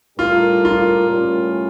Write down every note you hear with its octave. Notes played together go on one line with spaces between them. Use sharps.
A2 G3 D4 F4 G4 A#4
F4
A2 G3 C#4